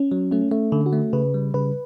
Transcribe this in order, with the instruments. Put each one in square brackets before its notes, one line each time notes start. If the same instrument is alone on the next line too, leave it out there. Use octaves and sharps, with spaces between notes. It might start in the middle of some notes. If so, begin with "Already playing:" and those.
Already playing: [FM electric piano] C#4
[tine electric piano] F#3
[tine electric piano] A3 [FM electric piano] C#4
[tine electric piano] A3
D3
[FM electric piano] F#4
[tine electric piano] A3
[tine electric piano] C#3 [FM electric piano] B4
[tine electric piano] G3
[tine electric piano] C#3 [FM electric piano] B4